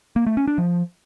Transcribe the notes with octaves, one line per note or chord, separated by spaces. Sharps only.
A#3
A3
C#4
D4
F3